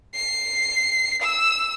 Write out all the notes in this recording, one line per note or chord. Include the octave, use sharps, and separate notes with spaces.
C7
E6